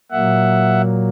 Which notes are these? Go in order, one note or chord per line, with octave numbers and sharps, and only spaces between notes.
A#2 F#3 A#3 E5 F#5